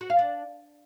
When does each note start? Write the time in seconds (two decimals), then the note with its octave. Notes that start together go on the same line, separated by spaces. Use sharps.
0.01 F#4
0.10 F5
0.19 D4